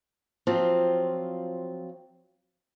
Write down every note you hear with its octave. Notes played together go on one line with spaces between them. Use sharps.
F3 F#3 C4 F4